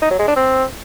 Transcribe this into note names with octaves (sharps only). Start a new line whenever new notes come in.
D#4
F#3
G#3
D4
C4